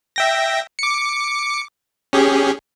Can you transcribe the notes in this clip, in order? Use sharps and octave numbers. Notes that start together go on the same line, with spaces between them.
E5 G5 A#6
D6 C#7
C#4 G4 G#4